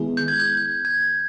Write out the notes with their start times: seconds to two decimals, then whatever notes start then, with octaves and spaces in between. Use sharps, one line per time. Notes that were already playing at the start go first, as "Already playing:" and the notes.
Already playing: D#3 G#3 B3 E4 G#4
0.17 G6
0.28 G#6
0.40 G6
0.85 G#6